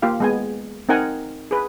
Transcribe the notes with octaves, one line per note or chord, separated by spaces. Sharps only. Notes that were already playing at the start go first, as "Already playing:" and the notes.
A#3 F4 G4 F5
G#3 B3 G#5
C4 D#4 A#4 F#5 G#5 A#5
G#4 B4